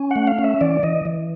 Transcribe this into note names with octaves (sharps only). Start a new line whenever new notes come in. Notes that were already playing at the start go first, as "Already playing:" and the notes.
Already playing: C#4
A3 F#5
F5
C#4
E5
E3 D5
E3 D#5
E3